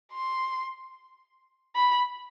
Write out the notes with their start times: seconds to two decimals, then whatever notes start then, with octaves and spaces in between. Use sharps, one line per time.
0.13 C6
1.75 B5